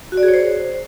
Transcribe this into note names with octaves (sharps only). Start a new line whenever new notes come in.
F#4
D5
G#4
C#5
C5